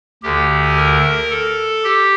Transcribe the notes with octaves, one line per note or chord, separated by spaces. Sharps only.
D2 D3 G4
A#4
A4
G4